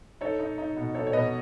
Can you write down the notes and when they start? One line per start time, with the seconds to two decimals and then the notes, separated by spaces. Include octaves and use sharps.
0.21 D#4 A4 C#5
0.39 D#4
0.58 D#4
0.76 B2
0.95 D#4 A4 C#5
1.07 C#5
1.13 B2 B4 D#5